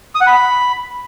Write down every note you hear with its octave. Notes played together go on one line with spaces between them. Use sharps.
D#6
F#5
B5